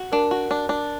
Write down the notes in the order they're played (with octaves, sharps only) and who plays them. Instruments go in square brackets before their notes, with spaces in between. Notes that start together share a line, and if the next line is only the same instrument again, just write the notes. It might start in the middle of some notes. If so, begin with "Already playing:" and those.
Already playing: [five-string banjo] F#4
[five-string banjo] D4 [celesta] A#4
[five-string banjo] F#4
D4
D4